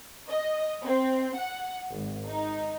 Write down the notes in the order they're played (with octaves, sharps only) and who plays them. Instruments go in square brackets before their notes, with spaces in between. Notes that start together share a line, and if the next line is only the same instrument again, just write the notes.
[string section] D#5
C4
F#5
G#1
D#4